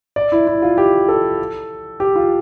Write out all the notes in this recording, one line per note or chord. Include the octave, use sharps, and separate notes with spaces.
D5
E4
E4
F4
G4
A4
G4
F4